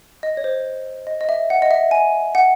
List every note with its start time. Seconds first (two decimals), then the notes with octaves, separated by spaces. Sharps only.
0.23 D#5
0.37 C#5
0.44 C5
1.07 D#5
1.21 D#5
1.29 E5
1.50 F#5
1.62 D#5
1.71 E5
1.91 G#5
2.35 F#5